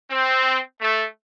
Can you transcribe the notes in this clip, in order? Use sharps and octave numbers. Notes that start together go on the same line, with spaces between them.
C4
A3